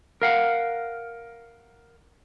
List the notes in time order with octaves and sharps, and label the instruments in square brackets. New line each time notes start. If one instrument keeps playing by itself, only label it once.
[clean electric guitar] A#4 F5 F#5